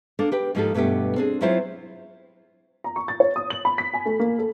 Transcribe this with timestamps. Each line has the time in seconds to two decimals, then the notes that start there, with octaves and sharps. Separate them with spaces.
0.19 A#3 D4 A4
0.32 G4 B4 G5
0.55 G#2 F3 A#3 D#4 G4 A4
0.74 G2 B2 A3 B3 G4
1.16 C4 D4 G#4
1.41 F#3 C4 E4 F4 C5 C#5
2.84 A#5
2.96 C#6
3.08 A6
3.20 C#5
3.36 D#6
3.50 F#7
3.65 B5
3.78 B6
3.94 G#5
4.06 A3
4.19 A#3
4.39 A4